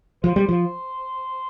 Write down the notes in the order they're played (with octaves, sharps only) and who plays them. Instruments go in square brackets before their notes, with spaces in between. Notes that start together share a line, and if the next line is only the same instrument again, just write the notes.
[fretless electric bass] F3 [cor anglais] C5
[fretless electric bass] G3
F3